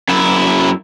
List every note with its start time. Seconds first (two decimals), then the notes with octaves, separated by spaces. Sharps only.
0.09 F#2 E4